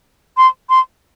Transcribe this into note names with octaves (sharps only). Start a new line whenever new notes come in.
C6
C6